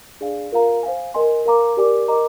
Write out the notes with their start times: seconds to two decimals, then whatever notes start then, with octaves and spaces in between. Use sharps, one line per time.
0.20 D4 G#4 D5 F5 G#5
0.52 F4 A#4 F5 A#5
0.83 C5 F5 G#5
1.14 A#4 D#5 G#5 C6
1.46 A#4 F5 A#5 D6
1.77 G4 A#4 D5 G#5 D6
2.08 A#4 D#5 A#5 D6